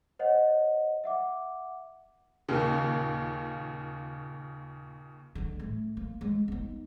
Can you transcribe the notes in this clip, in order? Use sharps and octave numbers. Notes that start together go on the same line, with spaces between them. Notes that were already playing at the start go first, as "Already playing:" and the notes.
C5 C#5 D#5 F#5
E5 F#5 D6
D#2 A#2 C#3
D3 G#3
A2 A3
A#3
G#3
B3 D#4